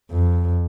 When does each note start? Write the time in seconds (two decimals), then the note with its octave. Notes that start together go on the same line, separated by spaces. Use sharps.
0.12 F2